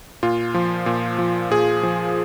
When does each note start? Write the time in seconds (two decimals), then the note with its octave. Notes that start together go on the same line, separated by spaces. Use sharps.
0.23 A#2 F4
0.54 F3
0.86 A#2
1.18 F3
1.51 A#2 G#4
1.83 F3